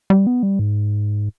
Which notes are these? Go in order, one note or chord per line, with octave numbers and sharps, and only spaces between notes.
G3
B3
G3
G#2